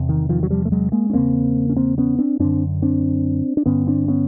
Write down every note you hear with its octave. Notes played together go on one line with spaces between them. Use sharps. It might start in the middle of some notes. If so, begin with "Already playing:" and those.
Already playing: E2 C3
D#3
D#3 F3
F#3
F3 G3
A3
F#3 G#3
G#3 A#3
C#4
E2 C#3 A#3 C4
C#4
A#3 C4
B3 C#4
C4 D4
F#2 D3 C4 D4
C4 D4
D4
G2 D3 B3 C#4
C4 D4
B3 C#4